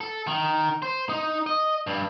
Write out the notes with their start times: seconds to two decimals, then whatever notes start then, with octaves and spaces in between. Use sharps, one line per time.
0.01 A4
0.27 D#3
0.82 C5
1.09 D#4
1.47 D#5
1.87 G2